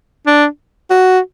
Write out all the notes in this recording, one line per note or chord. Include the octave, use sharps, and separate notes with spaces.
D4
F#4